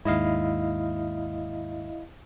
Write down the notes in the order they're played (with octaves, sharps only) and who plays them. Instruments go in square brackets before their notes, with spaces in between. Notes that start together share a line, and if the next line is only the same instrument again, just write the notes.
[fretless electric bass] D#2 G#2 [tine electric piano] E4 D#5 F5